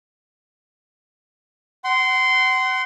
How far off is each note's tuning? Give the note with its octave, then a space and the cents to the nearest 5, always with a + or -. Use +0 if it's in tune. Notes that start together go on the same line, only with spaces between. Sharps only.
F#5 +35 C6 -15